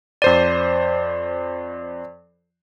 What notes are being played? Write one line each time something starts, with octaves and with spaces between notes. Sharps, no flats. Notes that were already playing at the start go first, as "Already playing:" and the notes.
F2 C5 D5 D#7